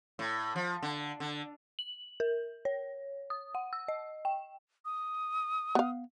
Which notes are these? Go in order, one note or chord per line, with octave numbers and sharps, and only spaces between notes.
A2
F3
D3
D3
F#7
A#4
C#5
D#6
F#5
E6
D#5
G5
D#6
B3 F5